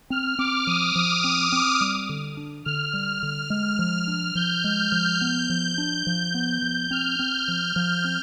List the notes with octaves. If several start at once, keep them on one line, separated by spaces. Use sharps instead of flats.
C4 F6
C4 D6
F3 D#6
F3 D#6
C4 D#6
C4 D6
G3
D3
D4
D3 F6
G3
D3
G#3
F3
D4
F3 G6
G#3
F3
B3
F3
D4
F3
B3
F3
C4 F6
C4
F3
F3
C4